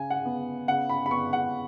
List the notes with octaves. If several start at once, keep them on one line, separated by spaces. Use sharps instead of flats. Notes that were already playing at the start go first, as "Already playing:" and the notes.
Already playing: C#3 G#5
F#5
B3
C#3 F#5
B5
B5
B3 C#6
F#5